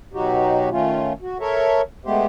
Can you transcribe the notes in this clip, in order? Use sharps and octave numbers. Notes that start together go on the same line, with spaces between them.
B2 F#3 D#4 F#4 G4
D#3 A3 C#4 F4
F#4
A4 A#4 C#5 E5
G#3 A3 B3 G4 C5